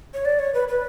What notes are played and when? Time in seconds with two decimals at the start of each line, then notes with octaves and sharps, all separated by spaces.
0.14 C#5
0.25 D5
0.39 C#5
0.54 B4
0.68 B4